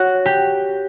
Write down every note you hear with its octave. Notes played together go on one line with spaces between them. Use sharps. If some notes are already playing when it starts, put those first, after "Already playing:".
Already playing: F#4 C#5
G4